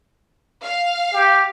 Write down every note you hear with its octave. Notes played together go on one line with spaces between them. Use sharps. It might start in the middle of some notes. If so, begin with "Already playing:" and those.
F5
G4